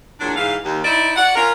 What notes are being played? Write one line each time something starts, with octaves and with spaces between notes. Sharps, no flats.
E2 A#2 F#3 D4
G#2 E3 F5
D#2
D#4 E4 C5 D5 E5
F#4 D5 F#5
C#4 F4 A#4